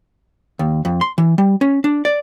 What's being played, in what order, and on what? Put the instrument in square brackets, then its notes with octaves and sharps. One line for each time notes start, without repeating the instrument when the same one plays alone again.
[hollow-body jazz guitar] D#2
F2
C6
E3
G3
C#4
D4
D5